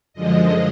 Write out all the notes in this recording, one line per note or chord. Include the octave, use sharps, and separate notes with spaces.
F#2 D3 F3 G#3 D#5